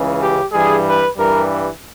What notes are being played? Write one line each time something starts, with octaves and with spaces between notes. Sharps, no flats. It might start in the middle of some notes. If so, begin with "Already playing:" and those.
Already playing: C#2 C#3 E3
G4
G2 E3 G3 G#4
B4
G2 E3 G3 A#4